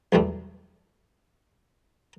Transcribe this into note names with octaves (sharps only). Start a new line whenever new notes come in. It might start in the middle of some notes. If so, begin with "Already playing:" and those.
B1 E2 G3 A3